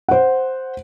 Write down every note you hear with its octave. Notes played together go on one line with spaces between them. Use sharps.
C5 F#5